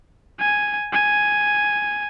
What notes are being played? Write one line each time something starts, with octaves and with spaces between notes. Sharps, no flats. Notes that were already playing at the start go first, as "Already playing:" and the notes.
G#5
G#5